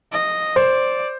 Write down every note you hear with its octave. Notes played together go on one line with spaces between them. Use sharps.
D#5
C5 D5